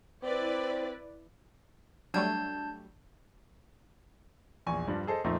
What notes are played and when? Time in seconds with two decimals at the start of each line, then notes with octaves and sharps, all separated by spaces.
0.23 C4 E4 B4 D5
2.14 F#3 G3 A3 D4 A5 G6
4.67 A#1 E2 G#5 C#6
4.87 G2 F3 G3 D4
5.07 G#4 A4 C5 D#5
5.24 F2 A#2 A3 C4 D#4